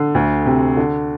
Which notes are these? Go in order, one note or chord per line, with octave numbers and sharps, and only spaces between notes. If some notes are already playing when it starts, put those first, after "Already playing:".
Already playing: D3
D2
C3
D3